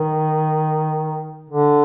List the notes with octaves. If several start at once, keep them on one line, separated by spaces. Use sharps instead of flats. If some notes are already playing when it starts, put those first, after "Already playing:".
Already playing: D#3
D3